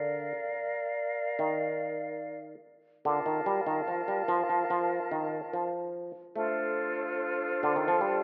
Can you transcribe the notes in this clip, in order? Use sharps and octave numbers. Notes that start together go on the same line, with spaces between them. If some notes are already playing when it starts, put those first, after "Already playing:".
Already playing: D3 A#4 D5 F5
D#3
D3 F4 A#4 F5 A5
D#3
G3
D#3
F3
G3
F3
F3
F3
D#3
F3
A3 D4 F4 A4 C5
D3
D#3
F3
G3